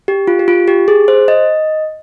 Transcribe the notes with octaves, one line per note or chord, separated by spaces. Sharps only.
G4
F4
G4
F4
G4
G#4
C5
D#5